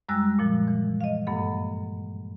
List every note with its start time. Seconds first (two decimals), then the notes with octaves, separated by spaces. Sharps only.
0.09 F#2 G3 G#3 E6 F#6 A#6
0.39 A#2 F3
0.68 E3
1.01 D#5 F5
1.27 G2 A#3 A4 F#5